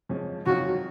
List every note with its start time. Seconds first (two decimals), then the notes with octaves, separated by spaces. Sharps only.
0.09 F2 F3 G#3 C#4
0.46 F2 D#3 F#3 C#4 F4 F#4